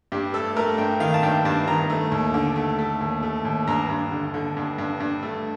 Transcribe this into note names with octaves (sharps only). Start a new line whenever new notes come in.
G2 G4
A3 A4
A3 A#4
G2 G5
D#3 F5
A5
G2 G5
G2 A5
D#3 A#5
A3
D#2
D3
A3
A3
D#2
A3
D#2
G2 A#5
G2
D3
D3
G2
G2
G2
A3